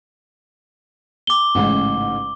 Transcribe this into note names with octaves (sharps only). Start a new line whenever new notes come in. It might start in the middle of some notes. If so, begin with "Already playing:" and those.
D6 G7
A1 G#2 C#3